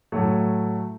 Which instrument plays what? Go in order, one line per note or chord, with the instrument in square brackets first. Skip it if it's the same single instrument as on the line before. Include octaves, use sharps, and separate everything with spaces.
[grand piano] A2 F#3 A3